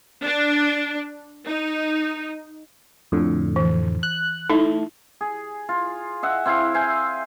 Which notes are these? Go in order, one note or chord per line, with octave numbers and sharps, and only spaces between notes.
D4
D#4
F2 A2 D3
E3
F#6
A3 D#4 E4
G#4
F4
D#5 E5 F#5
C4 E4 E5 F5
E5 F5 G5 G#5